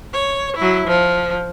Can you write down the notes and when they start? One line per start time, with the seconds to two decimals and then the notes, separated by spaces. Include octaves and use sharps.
0.13 C#5
0.57 F#3 E4
0.87 F3